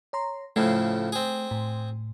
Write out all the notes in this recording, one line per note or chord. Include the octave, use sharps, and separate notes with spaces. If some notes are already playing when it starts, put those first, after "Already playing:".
C#5 A#5 C6
A2 C#3 F3 A3
C4 G#4
A2